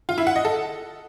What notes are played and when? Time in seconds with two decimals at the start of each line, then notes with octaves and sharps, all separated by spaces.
0.09 F4
0.18 E4
0.27 F#5
0.36 D#5
0.45 A4